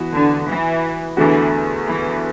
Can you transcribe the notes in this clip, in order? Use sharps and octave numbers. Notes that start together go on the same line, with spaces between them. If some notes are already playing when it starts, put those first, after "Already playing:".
Already playing: E3 B3 F#4 B4
D3
E3
E2 D3 E3 A3 F#4
E3